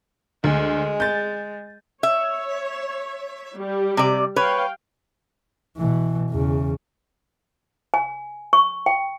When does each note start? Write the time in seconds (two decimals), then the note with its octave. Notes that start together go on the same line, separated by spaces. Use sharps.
0.44 D2 G#3
1.00 G6 A6
2.03 C#5 E5
3.56 G3 G4
3.97 C3 D5
4.36 B4 C#5 F5 G5
5.77 B2 E3
6.30 E2 C#3
7.94 G#5
8.53 C#6
8.86 G5